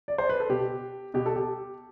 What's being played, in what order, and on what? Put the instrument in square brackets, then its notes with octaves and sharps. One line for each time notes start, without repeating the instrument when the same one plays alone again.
[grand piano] D5
C5
B4
A4
B2 G4
B2 G4
A4
G4